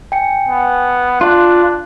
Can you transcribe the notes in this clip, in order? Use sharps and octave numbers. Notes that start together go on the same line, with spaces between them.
G5 G#5 C#7
B3
D4 F4 F#6